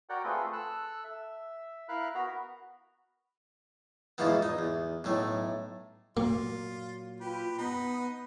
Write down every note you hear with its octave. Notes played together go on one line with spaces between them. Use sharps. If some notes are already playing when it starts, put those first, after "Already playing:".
F#4 A#4 D5 F#5 G5
A3 C4 F4 G#4 A4 B4
A4 E6 F#6
E5
E4 A#4 F5 B5 F#6
B3 F#4 A#4 A#5 B5
E2 G#2 B2 E3 F3 B3
D#4
E2
B1 A2 A3
A#2 F#3 A#3 F4
F4 G4 B4
B3 D#4 B4